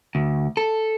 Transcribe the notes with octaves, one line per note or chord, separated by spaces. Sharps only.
D2
A4